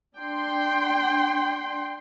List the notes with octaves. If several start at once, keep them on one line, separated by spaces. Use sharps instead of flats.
D4 G5 C6